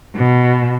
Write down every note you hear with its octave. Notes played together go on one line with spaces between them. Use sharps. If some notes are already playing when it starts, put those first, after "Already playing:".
B2